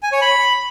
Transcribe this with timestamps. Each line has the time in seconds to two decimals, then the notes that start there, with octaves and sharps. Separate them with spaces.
0.03 G#5
0.12 C#5
0.22 B5